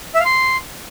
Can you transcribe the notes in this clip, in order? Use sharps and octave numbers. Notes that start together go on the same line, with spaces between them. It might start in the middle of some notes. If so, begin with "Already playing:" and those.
E5
F5
C6